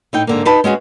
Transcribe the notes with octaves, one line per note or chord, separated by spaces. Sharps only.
A2 D#4 G5
G#2 D3 A#3
D#4 B4 A5
G#3 C#4 F#4 G#4